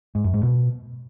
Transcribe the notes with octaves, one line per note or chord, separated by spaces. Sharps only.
G#2
F#2
G#2
B2